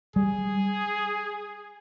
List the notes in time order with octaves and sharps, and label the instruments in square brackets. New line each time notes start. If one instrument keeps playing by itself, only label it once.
[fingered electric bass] G3 [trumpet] G#4